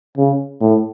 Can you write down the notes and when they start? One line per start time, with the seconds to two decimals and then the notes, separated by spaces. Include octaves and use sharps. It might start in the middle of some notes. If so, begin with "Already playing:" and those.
0.18 C#3
0.61 A2